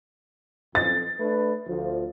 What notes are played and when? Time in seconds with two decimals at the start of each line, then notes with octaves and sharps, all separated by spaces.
0.75 F2 A6
1.20 A3 D4 B4
1.67 D2 F3